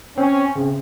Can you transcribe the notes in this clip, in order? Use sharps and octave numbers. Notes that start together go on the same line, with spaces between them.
C4 C#4
C#3